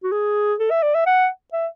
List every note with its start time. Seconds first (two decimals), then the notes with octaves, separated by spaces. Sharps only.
0.03 F#4
0.12 G#4
0.59 A4
0.71 E5
0.82 D5
0.95 E5
1.06 F#5
1.53 E5